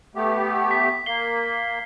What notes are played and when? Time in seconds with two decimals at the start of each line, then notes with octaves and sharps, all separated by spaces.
0.15 A3 B3 G4
0.71 B6
1.06 A#3 C7 G7